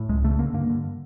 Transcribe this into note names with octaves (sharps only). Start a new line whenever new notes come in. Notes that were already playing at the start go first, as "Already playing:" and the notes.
Already playing: A2
C#2 G#3
C#3 A3
D3 A#3
G2 A#3
D3